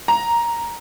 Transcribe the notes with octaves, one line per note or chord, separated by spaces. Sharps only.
A#5